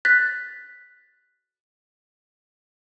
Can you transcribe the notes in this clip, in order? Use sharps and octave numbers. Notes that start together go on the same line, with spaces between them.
F#6 A6 B6